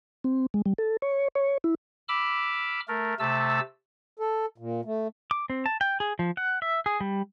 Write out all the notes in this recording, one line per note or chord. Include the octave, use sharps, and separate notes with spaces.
C4
G#3
G3
A4
C#5
C#5
E4
B5 D6 E6 F6
A3 A#4
C3 A3 A5 E6
A4
A#2
A3
D6
C4
A5
G5
G#4
F3
F#5
E5
G#4
G3